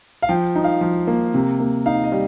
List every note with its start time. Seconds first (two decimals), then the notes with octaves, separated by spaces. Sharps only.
0.22 F5
0.29 F3 G5
0.55 D#4
0.64 F5
0.81 F3
1.07 A#3
1.34 C3
1.60 A#3
1.86 D#4 F5
2.04 D#5
2.12 G3